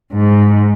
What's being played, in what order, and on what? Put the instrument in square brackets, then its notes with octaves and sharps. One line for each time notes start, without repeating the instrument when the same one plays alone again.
[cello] G#2